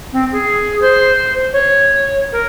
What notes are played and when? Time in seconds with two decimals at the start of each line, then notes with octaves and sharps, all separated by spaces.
0.12 C4
0.32 G#4
0.81 C5
1.53 C#5
2.32 A#4